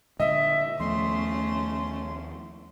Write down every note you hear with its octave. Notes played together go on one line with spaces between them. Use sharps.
A#2 D3 G#3 D#5 E5
D#2 F3 A3 B3 C#4 C6